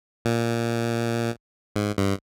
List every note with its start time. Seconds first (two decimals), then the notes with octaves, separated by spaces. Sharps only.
0.25 A#2
1.76 G#2
1.98 G2